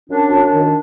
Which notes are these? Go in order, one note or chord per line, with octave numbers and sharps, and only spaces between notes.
F#2 D4
F#2
D4
D#3